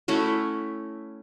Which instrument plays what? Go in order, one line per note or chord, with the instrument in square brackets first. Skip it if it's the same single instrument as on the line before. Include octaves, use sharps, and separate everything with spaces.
[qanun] A3 C#4 E4 F#4